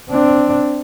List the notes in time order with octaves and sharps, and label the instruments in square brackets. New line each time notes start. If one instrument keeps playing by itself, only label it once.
[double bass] C4 D4